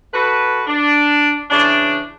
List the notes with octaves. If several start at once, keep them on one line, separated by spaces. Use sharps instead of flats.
F#4 A4 B4
D4
C#3 E3 D4